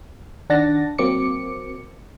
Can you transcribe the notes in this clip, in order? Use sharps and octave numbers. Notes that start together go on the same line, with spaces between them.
D#3 D4 F#5 A5 A6 A#6
F#3 A#3 C4 D6 C#7